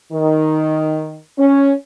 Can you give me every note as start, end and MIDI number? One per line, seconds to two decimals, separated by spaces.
0.12 1.18 51
1.38 1.72 61